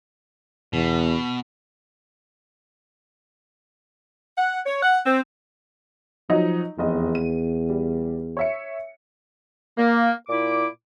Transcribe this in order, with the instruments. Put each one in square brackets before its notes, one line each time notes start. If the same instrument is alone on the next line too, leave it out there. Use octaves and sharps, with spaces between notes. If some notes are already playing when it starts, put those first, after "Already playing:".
[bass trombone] E2 [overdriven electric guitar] B2
[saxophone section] F#5
C#5
F#5
C4
[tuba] F3 [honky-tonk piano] F#3 D#4 D#5
[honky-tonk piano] F1 D#5 [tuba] E2
[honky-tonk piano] D#7
G3
C#5 E5 C#7
[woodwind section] A#3
A#2 E4 D6